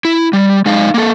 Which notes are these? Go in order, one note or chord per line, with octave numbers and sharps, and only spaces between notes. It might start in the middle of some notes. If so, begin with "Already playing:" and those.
E4
G3
G#3 D#4 F5
A#3 A4